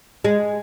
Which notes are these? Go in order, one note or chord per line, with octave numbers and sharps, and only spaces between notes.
G#3